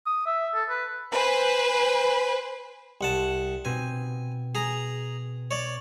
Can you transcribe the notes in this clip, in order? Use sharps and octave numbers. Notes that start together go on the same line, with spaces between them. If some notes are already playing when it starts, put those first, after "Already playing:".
D#6
E5
A4
B4
B4 C5 G#5
C2 F#5 A5
B2 C4 G#5
G#4 A#5
C#5 D5